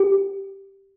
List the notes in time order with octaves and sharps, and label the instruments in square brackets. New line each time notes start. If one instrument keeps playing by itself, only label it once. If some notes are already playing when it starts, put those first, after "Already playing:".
Already playing: [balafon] G4